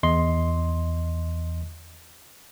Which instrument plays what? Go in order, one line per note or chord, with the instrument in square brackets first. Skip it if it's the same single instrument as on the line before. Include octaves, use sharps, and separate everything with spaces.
[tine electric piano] E2 D#5 C6